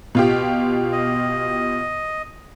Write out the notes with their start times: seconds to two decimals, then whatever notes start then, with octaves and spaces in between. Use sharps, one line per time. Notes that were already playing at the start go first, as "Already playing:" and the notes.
0.15 B2 F4 G4
0.92 D#5